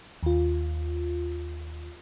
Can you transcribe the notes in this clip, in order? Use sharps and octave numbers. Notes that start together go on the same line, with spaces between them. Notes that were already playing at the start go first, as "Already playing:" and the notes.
D#2 F4